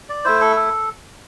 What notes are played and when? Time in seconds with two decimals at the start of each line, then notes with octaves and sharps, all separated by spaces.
0.09 D5
0.25 A3 E4 C5
0.41 A4
0.56 A4